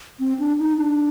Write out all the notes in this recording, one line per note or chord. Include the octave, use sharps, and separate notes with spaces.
C4
D4
D#4
D4